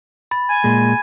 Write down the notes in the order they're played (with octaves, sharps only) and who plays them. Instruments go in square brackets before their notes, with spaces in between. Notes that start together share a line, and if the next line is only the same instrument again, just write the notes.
[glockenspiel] B5 A6
[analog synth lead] G#5
[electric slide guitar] A#2 G#3